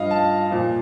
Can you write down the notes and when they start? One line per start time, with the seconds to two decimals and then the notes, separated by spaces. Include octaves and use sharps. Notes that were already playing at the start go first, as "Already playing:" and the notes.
Already playing: G2 F3 D#5 F5
0.11 A5
0.51 A#2 F3